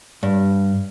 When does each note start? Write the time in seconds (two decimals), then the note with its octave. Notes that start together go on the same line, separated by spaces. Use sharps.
0.23 G2